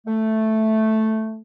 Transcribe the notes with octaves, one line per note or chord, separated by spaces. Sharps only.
A3